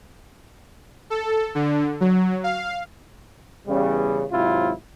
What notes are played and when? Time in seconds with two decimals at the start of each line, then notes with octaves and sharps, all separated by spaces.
1.10 A4
1.55 D3
2.01 F#3
2.44 F5
3.67 E2 C#3 G3
4.32 G#1 G#2 C3 F#3 E4 F4